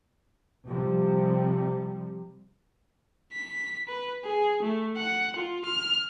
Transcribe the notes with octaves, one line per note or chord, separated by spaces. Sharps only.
C3 F3 G3
B6
B4
G#4
A3
F#5
F4
F6